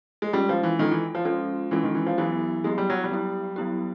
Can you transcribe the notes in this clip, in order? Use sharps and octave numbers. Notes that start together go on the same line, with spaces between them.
G#3
G3 G#3 C#4 F4 A4
F3
E3
D#3 G#3 C#4 F4 A4
E3
F3
F3 G#3 C#4 F4 A4
E3 G#3 C#4 F4 A4
D#3
E3
F3
E3 F#3 B3 E4 G4
F#3 G#3 B3 E4 G4
G3
F#3
G3
F#3 B3 E4 G4
F#3 B3 E4 G4